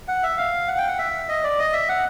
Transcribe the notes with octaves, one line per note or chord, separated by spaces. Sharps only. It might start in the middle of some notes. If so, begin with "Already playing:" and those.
F#5
E5
F5
F#5
G5
F#5
E5
D#5
D5
D#5
E5
F#5